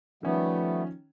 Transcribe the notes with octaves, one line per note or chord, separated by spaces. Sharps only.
D#3 F3 G3 A3 B3 C#4